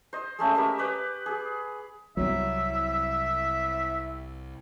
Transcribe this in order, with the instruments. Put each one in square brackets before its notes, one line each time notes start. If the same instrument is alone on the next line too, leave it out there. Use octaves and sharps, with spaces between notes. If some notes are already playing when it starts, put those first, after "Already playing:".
[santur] C5 D#5
G#3 A3 C#4
G4 A#4 E5
B4 D6 D#6
G#4
[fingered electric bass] C2 G3 [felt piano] F#3 [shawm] E5